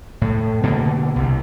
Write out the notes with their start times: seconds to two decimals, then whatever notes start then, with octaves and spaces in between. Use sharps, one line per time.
0.21 A2
0.63 B2 D3 A#3
1.16 C2 C3